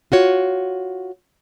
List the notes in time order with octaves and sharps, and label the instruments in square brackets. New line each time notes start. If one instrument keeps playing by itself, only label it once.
[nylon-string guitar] F4 F#4 C#5